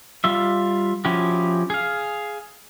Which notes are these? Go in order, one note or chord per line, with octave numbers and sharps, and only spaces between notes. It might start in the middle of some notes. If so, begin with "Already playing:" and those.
G3 F4 E5
F3 C#4 E4 F#4 G4
G#4 F5